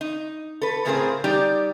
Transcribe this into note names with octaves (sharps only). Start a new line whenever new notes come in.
D#4
A4 B4
A2 C#3 C4 G#4 A#4 C5
G3 D#4 G4 D5